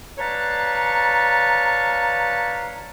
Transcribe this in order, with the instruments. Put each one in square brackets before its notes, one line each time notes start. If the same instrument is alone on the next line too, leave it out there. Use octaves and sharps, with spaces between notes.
[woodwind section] B4 C#5 D5 F5 A5 A#5